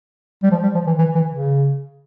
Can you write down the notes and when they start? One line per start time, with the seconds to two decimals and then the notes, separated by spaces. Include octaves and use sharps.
0.43 G3
0.51 F3
0.63 G3
0.75 F3
0.87 E3
0.98 E3
1.15 E3
1.31 C#3